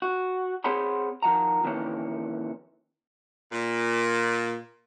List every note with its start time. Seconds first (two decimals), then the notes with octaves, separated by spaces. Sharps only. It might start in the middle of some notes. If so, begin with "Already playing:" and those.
0.02 F#4
0.64 C4 G#4 C#5 F#5 B5 C6
1.22 D#3 F3 F#5 A#5
1.64 F2 A#2 D#3 E3 C#4
3.52 A#2